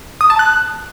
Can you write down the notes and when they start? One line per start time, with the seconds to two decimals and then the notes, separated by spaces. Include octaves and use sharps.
0.21 D#6
0.30 A5
0.39 F#6